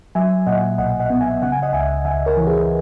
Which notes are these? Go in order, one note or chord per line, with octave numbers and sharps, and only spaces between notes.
F#3 E5 G#5
A#2 D#5 F#5
B1 D#5 F#5
D#5 F#5
B3
E5 G#5
C#3 F#5
G#5
D#5 F#5
C#2 E5 G#5
C#2 E5 G#5
A#4 C#5
E3
G#4 B4